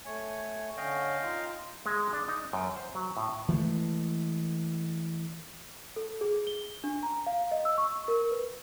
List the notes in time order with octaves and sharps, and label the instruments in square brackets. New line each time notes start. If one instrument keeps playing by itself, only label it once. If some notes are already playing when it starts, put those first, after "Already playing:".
[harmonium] A3 G#5 [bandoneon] C#5
[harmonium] D3 C#4 C#5 [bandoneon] D#5 F5 G5
[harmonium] D#4 F4
[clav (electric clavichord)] G#3
D4
D#4
F#2
C5
F#3
A2
[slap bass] E3 F3 G#3 A3
[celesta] A4
G#4
G7
D4
A#5
F5
D#5
E6
C#6
A#4
B4